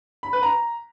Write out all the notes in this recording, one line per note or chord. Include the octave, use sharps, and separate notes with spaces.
B5
B4
A#5